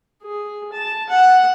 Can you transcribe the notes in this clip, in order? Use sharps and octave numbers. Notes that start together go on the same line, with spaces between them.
G#4
A5
F#5